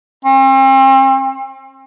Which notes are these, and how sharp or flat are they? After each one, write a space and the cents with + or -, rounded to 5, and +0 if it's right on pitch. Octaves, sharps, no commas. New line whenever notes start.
C4 +40